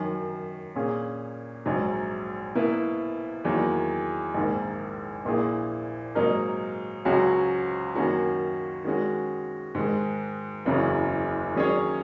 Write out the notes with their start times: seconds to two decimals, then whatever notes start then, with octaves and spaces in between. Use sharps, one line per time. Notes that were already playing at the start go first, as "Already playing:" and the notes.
Already playing: F#2 D#3 F#3
0.76 A#2 A#3 C#4 G#4
1.66 A#1 G#2 F#3
2.55 B2 A#3 E4 B4
3.45 E2 D#3 F#3 A#3
4.34 A#1 G#2 D#3 A#3
5.25 A#1 A#2 A#3 E4 G#4
6.15 G#2 F#3 A#3 D#4 A#4
7.05 C#2 C#3 F#3 C#4 F#4
7.95 F#2 D#3 A#3 C#4 F#4
8.85 D#3 G#3 C#4 F#4
9.75 G#2 D#3 G#3
10.66 F#1 E2 C#3 F#3 C#4
11.55 D#3 F#3 C#4 G#4 C#5